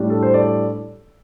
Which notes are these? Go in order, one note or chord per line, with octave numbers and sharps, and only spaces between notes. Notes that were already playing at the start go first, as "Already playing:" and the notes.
Already playing: A2 G3 D4
A4
C5
A4 D5